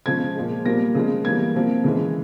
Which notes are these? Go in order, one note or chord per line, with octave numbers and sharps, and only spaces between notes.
C#3 F3 G#3 G#6
A#2 F3 G#3
A#2 G3 A#3 A#6
C#3 F3 G#3
E3 G3 A#3 G#6
C3 F3 A#3
C#3 E3 G#3